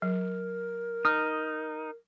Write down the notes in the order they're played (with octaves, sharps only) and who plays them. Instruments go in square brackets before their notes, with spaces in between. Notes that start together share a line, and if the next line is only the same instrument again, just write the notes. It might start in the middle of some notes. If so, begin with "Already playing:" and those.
[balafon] F#3 [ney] A#4
[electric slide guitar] D#4 [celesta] D#6 F6